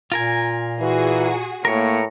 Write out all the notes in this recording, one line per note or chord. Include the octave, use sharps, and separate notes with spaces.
A#2 F4 A#4 G#5
E3 F#4 G#4
A2 A#3 A#4 C#5